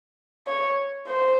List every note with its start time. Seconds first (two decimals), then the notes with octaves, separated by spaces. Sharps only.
0.47 C#5
1.08 C5